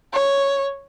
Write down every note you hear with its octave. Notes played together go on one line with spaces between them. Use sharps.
C#5